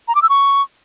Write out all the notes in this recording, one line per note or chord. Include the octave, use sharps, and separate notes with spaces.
A#5
D6
E6
C#6